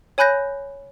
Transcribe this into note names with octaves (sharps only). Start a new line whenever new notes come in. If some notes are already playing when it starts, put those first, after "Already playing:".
C#5 G#5 B5 F#6 G6 A#6